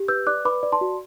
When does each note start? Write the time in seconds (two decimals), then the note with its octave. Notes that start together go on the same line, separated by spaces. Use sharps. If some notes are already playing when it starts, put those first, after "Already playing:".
Already playing: G4
0.08 B4 E6 G6
0.27 D5 D6 F#6
0.45 B4 B5 D6
0.63 D5
0.72 A5 C6
0.81 F#4